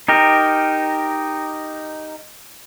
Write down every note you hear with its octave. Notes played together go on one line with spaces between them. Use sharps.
D#4 G4 A#4